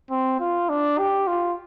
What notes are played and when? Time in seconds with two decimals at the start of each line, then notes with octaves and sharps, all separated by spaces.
0.11 C4
0.40 F4
0.69 D4
0.98 G4
1.27 F4